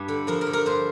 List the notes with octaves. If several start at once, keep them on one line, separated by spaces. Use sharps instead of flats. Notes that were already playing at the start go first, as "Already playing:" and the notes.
Already playing: G2 G4
D3
F3 A#4
A#4
D3
A#4
G2 C5